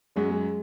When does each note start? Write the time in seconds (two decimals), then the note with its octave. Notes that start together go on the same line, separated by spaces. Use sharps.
0.16 F#2 F#3 G#3 C#4 F#4
0.30 G#3